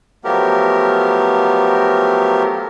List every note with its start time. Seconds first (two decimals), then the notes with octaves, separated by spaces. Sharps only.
0.24 F3 F#3 A3 B3 G4 A#4